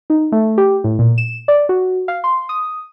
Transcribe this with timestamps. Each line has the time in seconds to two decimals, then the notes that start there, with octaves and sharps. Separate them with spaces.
0.10 D#4
0.32 A3
0.58 G4
0.84 A2
0.99 A#2
1.18 E7
1.48 D5
1.69 F#4
2.08 F5
2.24 C6
2.49 D#6